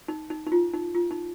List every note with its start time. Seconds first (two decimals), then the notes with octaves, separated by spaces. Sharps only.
0.08 D#4
0.30 D#4
0.46 D#4
0.52 F4
0.74 D#4
0.95 F4
1.11 D#4